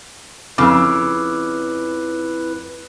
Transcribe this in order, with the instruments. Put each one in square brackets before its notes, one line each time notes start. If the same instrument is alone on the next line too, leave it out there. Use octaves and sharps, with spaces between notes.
[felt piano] F2 B5 F6 [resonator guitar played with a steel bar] C#3 [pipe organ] E4 B4 [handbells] D6 E6